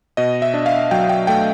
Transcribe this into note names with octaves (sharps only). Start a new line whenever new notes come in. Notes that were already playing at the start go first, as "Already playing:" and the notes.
B2 D#5
E5
D4
F5
F#3 G5
G5
A3 G5